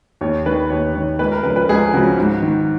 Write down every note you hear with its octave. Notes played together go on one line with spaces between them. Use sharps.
D#2 C#5
D#3 B4
D#2 C#5
D#3 C#5
C#2 B4
A#4
C#3 F3 B4
B4
C#2 G#4
C#3 F3 F#4
G#2
D#3